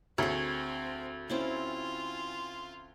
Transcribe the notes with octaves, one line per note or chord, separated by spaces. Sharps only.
D2 C4 G#4 C#5
C4 C#4 E4 F4